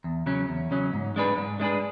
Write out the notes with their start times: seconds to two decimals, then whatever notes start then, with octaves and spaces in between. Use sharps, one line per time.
0.04 E2
0.26 C#3 F#3 C#4
0.49 E2
0.71 C#3 F#3 C#4
0.93 G#2
1.16 G#3 D4 G#4 B4
1.38 G#2
1.60 G#3 D4 G#4 B4